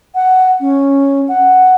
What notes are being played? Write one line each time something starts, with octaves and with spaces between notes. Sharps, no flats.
F#5
C#4
F#5